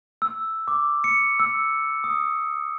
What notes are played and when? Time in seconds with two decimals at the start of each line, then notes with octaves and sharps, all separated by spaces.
0.22 E6
0.68 D6
1.04 C#7
1.40 E6
2.04 D#6